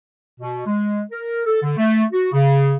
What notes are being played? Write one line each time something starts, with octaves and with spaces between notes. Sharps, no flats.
B2
G#3
A#4
A4
D3
A3
F#4
C#3